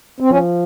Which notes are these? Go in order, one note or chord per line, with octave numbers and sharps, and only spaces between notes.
C4
F3 C#4